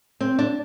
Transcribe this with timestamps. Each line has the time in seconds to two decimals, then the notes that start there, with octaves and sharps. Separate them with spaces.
0.21 C4
0.39 D4